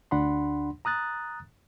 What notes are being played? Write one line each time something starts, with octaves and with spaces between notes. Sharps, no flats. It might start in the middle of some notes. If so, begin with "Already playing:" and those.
D2 D4 F#5 B5 C6
A#5 D#6 F#6 A6